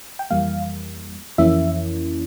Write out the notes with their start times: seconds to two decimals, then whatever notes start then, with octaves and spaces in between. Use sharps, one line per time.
0.19 G5
0.30 F2 E3 G3 A#3 F5
1.38 F2 E3 A#3 C#4 E4 E5